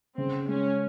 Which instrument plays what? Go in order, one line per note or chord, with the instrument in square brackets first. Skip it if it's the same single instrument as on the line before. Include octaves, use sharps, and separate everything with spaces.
[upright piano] C#3 [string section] C4
[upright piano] G#3 [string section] C#4